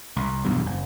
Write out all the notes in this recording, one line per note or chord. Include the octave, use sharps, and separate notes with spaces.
C2
B1 E2 G2
F#1